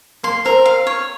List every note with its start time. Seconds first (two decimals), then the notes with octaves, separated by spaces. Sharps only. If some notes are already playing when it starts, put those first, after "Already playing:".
0.24 A#3 C6
0.45 C4 A#4
0.66 F5
0.87 C#5